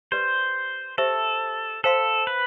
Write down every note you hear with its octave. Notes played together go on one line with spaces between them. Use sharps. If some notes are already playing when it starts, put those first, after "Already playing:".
G4 B4 C5 D5
G4 A4 C5 E5
A4 C5 F5 A5 C6
B4